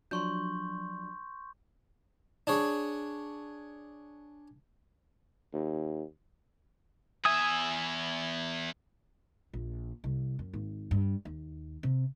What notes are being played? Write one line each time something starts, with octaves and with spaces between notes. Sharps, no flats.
F3 F#3 D4 C6 C#6 G6
D4 G#4 C#5
D#2
E2 E5 G#5 D#6
A#1
C2
F#2
G#1
G2
D#2
C3